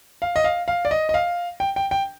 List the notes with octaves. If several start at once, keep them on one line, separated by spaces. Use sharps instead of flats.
F5
D#5
F5
F5
D5
D#5
D#5
F5
G5
G5
G5